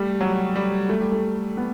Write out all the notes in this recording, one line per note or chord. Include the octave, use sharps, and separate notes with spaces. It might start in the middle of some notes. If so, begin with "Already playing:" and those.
Already playing: G3 A3
F#3
G3
A3
G3
A3
B3